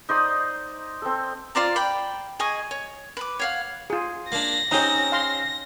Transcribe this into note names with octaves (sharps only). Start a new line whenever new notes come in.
D#4 C5 D5 D#6
C4 A4
F4 C5 D5 A#5
D5 G5 B5
G#4 D#5 G#5 C#6
C#5
B4 B5 D6
C#5 F5 F#5
F4 G#4
A#3 D4 A#6
C4 C#4 D#4 G4 D#5 A#5
F5 C6